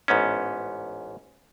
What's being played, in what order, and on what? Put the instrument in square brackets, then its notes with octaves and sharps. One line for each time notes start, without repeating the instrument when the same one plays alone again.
[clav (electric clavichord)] A1 G#2 B3 C#4